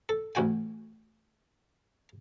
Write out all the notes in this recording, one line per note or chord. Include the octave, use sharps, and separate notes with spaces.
A4
A1 D2 F#4 G5 G#5